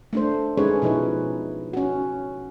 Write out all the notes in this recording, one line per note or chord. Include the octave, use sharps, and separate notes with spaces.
A3 D4 C5
G#3 C#4 D#4 G#4 B4 C#5
B2 F3 D#4 E4 B4
C#4 F#4